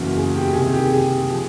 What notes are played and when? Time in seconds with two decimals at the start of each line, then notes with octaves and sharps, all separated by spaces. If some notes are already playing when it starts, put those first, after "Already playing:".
Already playing: F#1 E2 C#3 E3 F#4
0.16 G#4
0.35 G4
0.53 C2 C3 D#3 G#4
0.73 G4
0.92 G#4
1.30 F3